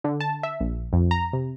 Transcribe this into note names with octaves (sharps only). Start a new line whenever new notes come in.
D3
A5
E5
A#1
F2
A#5
C3